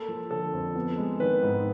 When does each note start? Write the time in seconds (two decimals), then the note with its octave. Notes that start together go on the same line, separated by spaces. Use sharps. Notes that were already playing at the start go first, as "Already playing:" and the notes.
Already playing: A#3 A4
0.08 F3
0.31 D3 A4
0.53 F2
0.75 B3
0.98 G#3
1.20 D#3 B4
1.43 G#2